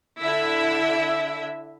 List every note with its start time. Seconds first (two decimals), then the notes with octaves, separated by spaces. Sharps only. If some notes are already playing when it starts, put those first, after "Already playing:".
0.20 D3 E4 E5